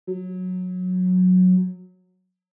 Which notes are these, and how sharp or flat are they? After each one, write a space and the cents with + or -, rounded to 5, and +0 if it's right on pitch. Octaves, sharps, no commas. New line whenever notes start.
F#3 -15